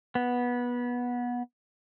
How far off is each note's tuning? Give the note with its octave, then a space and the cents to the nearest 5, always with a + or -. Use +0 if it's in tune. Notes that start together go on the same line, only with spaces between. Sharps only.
B3 -15